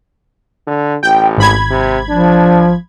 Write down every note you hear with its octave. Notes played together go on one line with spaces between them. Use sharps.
D3
A1 G5
G#1 B5 G#6
C3
F3 D4